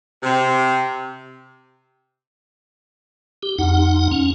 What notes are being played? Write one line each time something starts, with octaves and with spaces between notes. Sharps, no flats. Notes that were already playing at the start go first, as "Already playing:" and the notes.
C3
G4
F2 D#4 F#5
C#4